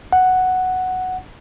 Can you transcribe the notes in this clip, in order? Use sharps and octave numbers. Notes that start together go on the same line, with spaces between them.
F#5